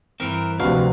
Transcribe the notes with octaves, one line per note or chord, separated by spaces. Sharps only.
G2 E3 C4 A#4
D2 C3 F3 D4 F#4 B4 F5